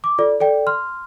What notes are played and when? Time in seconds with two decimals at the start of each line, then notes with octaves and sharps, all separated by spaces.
0.04 D6
0.18 F4 A4 D5
0.40 A4 D5 G5
0.67 C6 F6